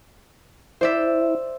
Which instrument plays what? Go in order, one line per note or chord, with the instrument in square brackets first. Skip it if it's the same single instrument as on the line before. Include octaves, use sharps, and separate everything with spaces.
[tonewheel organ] E4 [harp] C5 D5 E5